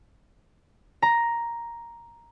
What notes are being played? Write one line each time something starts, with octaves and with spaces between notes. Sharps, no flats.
A#5